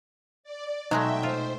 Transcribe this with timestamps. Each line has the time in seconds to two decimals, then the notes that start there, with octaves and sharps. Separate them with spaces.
0.44 D5
0.91 B2 F#3 G#3 A3 D#4 D#5 E5 G5
1.23 F4 C5